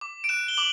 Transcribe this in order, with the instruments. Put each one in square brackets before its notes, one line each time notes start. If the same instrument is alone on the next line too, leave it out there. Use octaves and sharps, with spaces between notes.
[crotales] D6
D7
F#6 E7
G7
D6 F#7